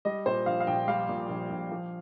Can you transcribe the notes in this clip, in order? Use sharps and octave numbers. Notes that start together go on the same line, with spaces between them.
G3 D#5
A#2 C5
A#1 F5
F5
A#1 G5
G3 F5
A#2
A#1
A#1
F3